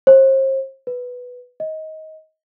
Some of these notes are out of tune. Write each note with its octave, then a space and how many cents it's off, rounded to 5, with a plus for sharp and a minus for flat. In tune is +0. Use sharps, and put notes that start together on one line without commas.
C5 +40
B4 +0
D#5 +20